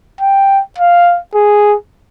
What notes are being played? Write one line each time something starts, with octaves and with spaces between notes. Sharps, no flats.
G5
F5
G#4